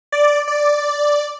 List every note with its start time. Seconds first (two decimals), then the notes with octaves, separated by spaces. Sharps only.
0.12 D5
0.48 D5